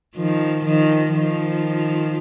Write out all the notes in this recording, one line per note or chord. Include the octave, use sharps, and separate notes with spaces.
D#3 F3
D#3 F3
D#3 F3